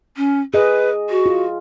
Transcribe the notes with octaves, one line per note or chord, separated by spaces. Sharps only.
C#4
G#4 B4 D#5
F#4
F4